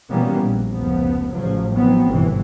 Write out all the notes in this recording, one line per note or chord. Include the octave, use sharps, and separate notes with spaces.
B2 E3 G3 A#3 B3 C#4
A#1
F1 C#2 F3 B3
A1 C#3 F3 F#3
D#3 F3 F#3 B3 C4
G1 C2 G#2 B2 E3